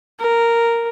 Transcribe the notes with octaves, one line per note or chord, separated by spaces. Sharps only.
A#4